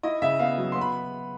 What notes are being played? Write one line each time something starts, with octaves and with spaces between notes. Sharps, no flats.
E4 D#5
C#3 E5
B3 F5
F#3
B3 C6
B5